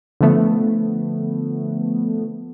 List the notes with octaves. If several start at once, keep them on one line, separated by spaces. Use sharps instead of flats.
D3 F3 A3 B3